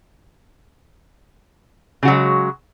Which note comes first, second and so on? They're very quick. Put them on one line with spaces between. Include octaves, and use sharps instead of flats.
C#3 F#4 F#3 G#3